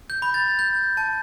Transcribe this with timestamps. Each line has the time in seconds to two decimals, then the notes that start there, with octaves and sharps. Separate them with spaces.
0.10 G6
0.22 B5
0.34 A6
0.59 G6
0.97 A5